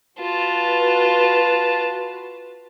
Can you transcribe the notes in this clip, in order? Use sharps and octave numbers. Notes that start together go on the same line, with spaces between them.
F4 F#4 B4 A5